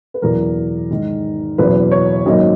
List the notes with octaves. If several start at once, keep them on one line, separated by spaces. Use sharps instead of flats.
B4
F#1 E2 B2 A#4
G#2 D#3 G#3 D#4
F#1 E2 B2 F#3 B4
C#5
G#1 F#2 D#3 F#3 A#3 D#5